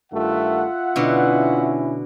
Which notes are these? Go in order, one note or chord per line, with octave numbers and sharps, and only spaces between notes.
G2 D#3 A3 F4 E5 F#5
B2 D3 C#4 E4